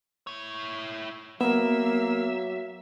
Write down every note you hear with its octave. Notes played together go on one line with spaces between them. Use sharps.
E4 C#5
F#3 A#3 B3 E5